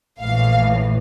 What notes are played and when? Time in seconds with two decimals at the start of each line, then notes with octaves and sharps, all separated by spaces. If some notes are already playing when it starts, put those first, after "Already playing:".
0.21 A#1 A2 E3 F5